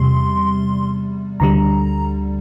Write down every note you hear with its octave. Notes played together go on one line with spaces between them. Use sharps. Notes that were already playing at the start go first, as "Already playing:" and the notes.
Already playing: E2 C3 G3 C6
D2 D3 G3 A#5